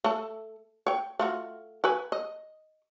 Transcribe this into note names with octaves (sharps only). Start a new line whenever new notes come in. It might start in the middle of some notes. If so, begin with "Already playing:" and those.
A3 A4
C#5 G5
A3 F4 F#4
F#4 B4 G#5
D#5